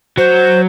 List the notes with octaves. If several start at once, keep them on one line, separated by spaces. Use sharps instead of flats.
F#3 C5